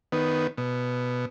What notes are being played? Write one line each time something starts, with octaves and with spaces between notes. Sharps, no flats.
D#3 B3
B2